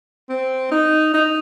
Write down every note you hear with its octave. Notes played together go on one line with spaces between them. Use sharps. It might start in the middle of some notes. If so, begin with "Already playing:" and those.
C4
D#4
D#4